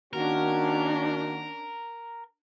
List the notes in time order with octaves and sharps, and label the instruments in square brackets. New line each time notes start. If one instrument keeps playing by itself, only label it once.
[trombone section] D#3 A#3 F#4 [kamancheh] C#4 D4 [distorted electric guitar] A#4